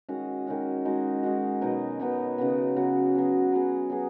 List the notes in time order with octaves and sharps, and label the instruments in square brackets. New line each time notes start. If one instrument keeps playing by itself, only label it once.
[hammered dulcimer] D#3 G#3 C#4 F#4
D#3 G#3 C#4 F#4
G#3 D#4 F#4
G#3 D#4 F#4
B2 F#3 B3 D#4
B2 F#3 B3 D#4
C#3 F#3 B3 F#4
C#3 F#3 B3 F#4
F#3 B3 G#4
F#3 B3 G#4
F#3 B3 G#4